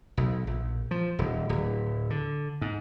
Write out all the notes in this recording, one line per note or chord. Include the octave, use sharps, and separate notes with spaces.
B1
A#1
F3
D#1
D1
D3
G#2